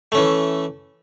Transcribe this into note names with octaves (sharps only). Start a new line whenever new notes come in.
E3 A3 C#4